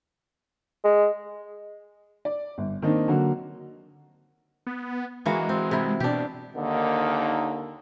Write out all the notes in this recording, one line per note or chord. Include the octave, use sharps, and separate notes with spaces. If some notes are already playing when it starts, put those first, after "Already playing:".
G#3
D5
G1
D#3 A#3 C4 D4 D#4
D3 F#3 A#3 F#4
B3
E3 G#3 A#3 F#4
C4
C3 E4
B2 D4 G4
D#2 D3 D#3 A#3 D#4